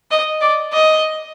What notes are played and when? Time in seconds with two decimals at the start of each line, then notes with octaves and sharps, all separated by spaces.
0.11 D#5
0.41 D5
0.72 D#5